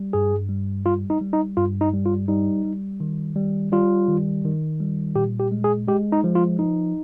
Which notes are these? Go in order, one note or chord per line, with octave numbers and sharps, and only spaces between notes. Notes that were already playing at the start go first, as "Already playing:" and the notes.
Already playing: G3
G2 G#4
G3
G3 F4
D#4
G3
D#4
G2 F4
D#4
G3
F4
G3 D#4
G3
D#3
G3
G3 F4
D#3
D#3
G3
A#2 G4
G4
G#3
G#4
G#3 G4
D#4
F3
F4
F3 D#4